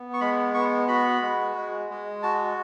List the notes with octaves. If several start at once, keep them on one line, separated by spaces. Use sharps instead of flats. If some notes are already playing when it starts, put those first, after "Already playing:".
Already playing: B3
C#6
G#3 B5
B3 C#6
F#4 B5
G#3
G#3
G#3
F#4 A5